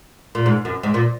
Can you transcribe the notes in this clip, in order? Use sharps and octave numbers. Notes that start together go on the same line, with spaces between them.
A#2
G#2
F#2
G#2
A#2